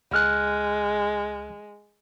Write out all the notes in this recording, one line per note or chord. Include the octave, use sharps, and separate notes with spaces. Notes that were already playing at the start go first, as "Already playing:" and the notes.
C#2 G#3 F6 F#6